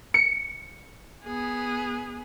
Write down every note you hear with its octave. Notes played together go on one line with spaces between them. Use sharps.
C#7
B3 G#4